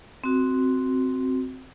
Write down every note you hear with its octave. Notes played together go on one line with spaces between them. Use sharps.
C4 F#4